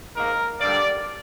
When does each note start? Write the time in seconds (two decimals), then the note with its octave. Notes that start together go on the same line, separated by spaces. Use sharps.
0.16 G#2 D#3 A#3 A#4
0.60 G2 D3 G3 A#3 D5